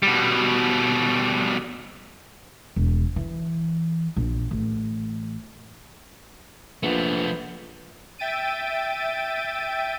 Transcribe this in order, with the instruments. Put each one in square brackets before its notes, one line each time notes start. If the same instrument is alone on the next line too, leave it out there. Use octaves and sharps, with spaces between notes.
[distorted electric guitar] B2 G3
[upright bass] E1
E3
A#1
A1
[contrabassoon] A#1 [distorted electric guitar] F3 A3 [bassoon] B3
[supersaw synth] E5 G5 A6 D7 D#7